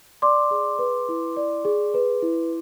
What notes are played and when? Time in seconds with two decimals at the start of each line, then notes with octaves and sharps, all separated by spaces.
0.22 D5 C6 D6
0.51 G#4
0.79 B4
1.09 E4
1.37 D5
1.65 G#4
1.94 B4
2.22 E4